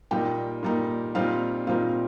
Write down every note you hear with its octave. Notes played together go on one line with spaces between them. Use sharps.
A#2 G3 A#3 D#4 G4 G5
A#2 G3 A#3 D#4
A#2 G3 C4 D#4 F4 F5
A#2 G3 C4 D#4 F4 F5